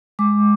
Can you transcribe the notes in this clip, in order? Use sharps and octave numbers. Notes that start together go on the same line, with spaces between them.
G#3 D6